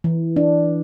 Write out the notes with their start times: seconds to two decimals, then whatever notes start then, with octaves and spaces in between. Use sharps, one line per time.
0.04 E3
0.36 D4